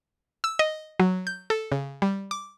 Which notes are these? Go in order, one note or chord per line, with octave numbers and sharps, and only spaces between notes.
E6
D#5
F#3
G6
A4
C#3
G3
D6